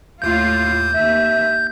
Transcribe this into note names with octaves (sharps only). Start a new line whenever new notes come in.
D#2 A2 F4 G6
D#2 E5 G6